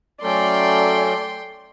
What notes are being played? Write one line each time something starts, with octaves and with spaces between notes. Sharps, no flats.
F#3 A3 C#4 A4 D5 G5 C6